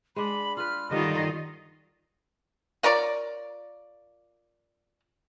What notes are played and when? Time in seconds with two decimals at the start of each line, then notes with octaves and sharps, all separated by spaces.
0.16 G#3 D4 B5
0.57 F4 B4 F6
0.91 G2 D3 D#3 F4 D#5
2.83 F4 A#4 C#5 D5